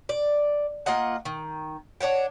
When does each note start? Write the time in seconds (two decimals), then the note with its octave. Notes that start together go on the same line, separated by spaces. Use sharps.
0.09 D5
0.86 A#3 F4 D#5 F#5
1.25 D#3
2.01 D4 C#5 F#5 G5